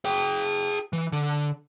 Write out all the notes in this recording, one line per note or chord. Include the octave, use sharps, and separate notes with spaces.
G#4 G5
E3
D3